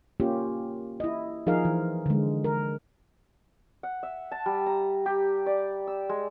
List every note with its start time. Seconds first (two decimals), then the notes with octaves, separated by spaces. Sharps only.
0.20 A#3 C#4 F4 G4
1.00 E4 D#5
1.47 F3 D#4 G#4 A#4 F5
1.65 E3
2.06 D3 G#3
2.44 A#4
3.83 F#5
4.03 E5
4.32 A5
4.46 G3
4.66 A#5
5.06 G4
5.46 D5
5.87 E6
6.09 G#3